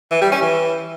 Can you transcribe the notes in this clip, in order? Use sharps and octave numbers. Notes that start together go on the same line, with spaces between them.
E3
G3
C#4
E3